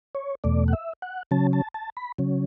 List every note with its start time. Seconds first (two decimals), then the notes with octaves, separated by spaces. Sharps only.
0.15 C#5
0.44 E2 B2 A3 D5
0.68 F#5
0.73 E5
1.02 F#5
1.31 C#3 F#3 C#4 A5
1.53 A5
1.74 A5
1.97 B5
2.18 C#3 F#3 C#4